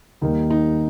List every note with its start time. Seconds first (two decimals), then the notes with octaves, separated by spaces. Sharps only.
0.21 D#2 D#3 G3 A#3 D#4
0.50 D#4